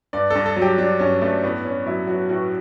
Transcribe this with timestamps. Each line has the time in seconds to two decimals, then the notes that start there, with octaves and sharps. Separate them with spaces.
0.13 G2 D5
0.30 G2 A4
0.46 A4
0.56 F#3
0.62 G4
0.78 F#3 D4
1.00 G2 C#4
1.21 G2 A3
1.44 A2 B3
1.65 A2 C#4
1.86 F#3 E4
2.08 F#3 F#4
2.29 A2 F#4